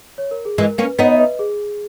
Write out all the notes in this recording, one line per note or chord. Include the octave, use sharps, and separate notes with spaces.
C#5
A#4
G#4
E3 G#3 A#4
A#3 C#4 B4
B3 D#4 C#5
E5
B4 D#5
G#4